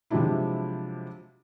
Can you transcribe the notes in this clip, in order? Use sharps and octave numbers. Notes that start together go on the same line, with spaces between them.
C3 F3 F#3 G#3 D4 E4